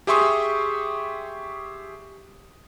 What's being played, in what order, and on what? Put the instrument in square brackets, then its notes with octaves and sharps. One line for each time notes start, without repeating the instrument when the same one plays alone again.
[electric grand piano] G4 G#4 E5 C6 C#6 D#6